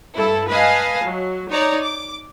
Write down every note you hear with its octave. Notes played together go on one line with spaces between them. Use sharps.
G2 E4 A4
B4 D#5 F5 G#5 A5
F#3
D#4 C#5 D5 A#5
D6